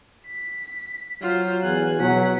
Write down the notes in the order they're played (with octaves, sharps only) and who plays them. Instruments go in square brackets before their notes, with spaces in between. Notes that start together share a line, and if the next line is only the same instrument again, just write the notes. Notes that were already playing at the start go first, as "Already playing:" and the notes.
[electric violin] B6
[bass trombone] F#3 [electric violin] F4 C5
[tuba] E2 [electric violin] G#5 F#6
[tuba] B2 [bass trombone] F#3 [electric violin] F#5 B6